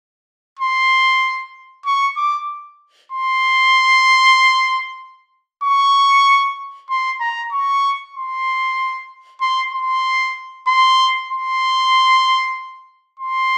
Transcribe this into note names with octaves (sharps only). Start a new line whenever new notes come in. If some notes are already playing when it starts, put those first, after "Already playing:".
C6
C#6
D6
C6
C#6
C6
A#5
C#6
C6
C6
C6
C6
C6
C6